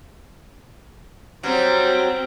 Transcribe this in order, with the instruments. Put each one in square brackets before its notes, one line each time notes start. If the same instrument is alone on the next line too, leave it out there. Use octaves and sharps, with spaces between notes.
[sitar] F#3 G3 [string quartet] C4